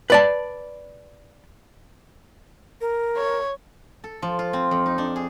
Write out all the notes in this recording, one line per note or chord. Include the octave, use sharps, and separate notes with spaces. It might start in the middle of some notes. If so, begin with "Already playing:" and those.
B4 D5 A5
A#4
C#5
A4
F3
F4
C4
F2
D#4
D4
G#4